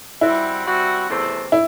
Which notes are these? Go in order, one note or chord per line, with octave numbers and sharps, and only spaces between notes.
G3 C4 E4 F#4
G3 C4 F#4
E2 C3 E3 A3 C4
E4